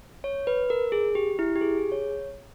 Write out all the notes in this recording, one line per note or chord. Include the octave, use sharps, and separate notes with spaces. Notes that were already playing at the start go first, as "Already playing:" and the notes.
C#5
B4
A#4
G#4
G4
E4
G4
G#4
G#4
C#5